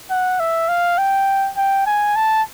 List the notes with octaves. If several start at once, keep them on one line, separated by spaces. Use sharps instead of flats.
F#5
E5
F5
G5
G5
G#5
A5